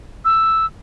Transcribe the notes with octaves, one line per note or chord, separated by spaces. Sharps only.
E6